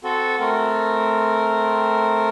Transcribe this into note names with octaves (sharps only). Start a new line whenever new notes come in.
C4 F#4 A4
A3 C4 A#4